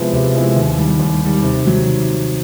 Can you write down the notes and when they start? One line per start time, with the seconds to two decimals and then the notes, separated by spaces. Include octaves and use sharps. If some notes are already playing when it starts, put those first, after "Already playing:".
Already playing: C3 F3 G#3 B3 E4
0.13 C3
0.34 F3 G#3 B3 E4
0.56 D#2
0.78 D#3 G3
1.00 D#2
1.22 D#3 G3
1.42 C3
1.64 D#3 F#3
1.87 C3